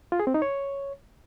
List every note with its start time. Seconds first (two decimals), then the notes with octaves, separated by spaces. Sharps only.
0.12 F4
0.19 G#4
0.27 C4
0.34 D#4
0.42 C#5